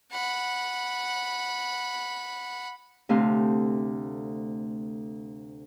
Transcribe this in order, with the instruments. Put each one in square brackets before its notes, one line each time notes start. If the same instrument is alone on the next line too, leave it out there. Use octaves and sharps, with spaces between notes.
[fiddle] F#5 B5
[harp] D2 C3 A3 C4 F5